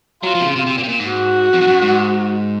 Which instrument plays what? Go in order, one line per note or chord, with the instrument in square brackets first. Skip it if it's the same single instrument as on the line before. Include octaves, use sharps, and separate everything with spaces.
[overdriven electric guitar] F#3 [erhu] F4
[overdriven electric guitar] F3
C3
C#3
C3
C3
A#2
C3
A#2
G#2
[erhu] F#4
[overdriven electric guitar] F2
G#2
F#2
G#2